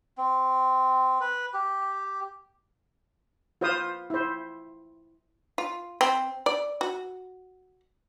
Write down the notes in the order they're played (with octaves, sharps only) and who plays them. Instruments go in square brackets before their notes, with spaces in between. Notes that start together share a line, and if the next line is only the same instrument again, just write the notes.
[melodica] C4
B4
G4
[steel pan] F4 B4 C5 F5 D#6
E4 C5
[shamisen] F4
C4
D5
F#4